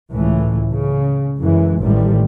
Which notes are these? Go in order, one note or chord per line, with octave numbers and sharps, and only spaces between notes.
C#2 A2 E3
C#3
F#2 E3 G#3
A1 A2 D#3 G3